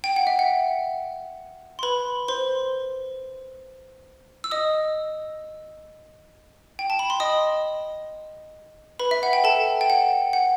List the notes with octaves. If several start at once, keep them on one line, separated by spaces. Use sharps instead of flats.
G5
F#5
E5
F#5
C6
B4 B5
C5 C6
E6
D#5 D#6
G5
A5
B5
C6
D#5 D#6
B4 B5
E5
F#5
G5
A4 A5
G5
F#5
F#5